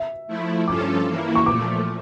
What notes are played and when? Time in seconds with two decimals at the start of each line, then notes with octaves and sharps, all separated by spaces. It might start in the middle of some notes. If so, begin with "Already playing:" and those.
Already playing: E5
0.27 F3 A3 E4
0.67 G2 F3 C#4 F4 A4 D6
1.07 E3 A#3 E4
1.35 C#6
1.46 A#2 F3 A3 D6